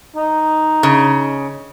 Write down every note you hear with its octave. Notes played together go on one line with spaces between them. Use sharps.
D#4
C#3